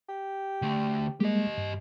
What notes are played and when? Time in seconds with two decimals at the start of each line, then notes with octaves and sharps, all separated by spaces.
0.09 G4
0.62 D3 A3
1.20 G3 G#3 A#3 G4 D#5
1.58 G2